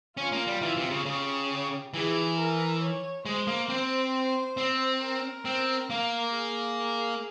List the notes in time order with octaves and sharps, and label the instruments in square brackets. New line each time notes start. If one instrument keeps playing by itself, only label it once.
[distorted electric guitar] C#4 [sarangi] F4
[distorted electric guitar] A#3
G3
E3
C3
C#3
[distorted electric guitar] C#3 [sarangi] G4
[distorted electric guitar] E3 [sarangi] G#4
[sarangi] A#4
C#5
[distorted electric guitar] G#3 [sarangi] C5
[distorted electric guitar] A#3
[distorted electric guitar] C4 [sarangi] C5
[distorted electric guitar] C4
[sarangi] A#4
[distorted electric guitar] C4
A#3
[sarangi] G#4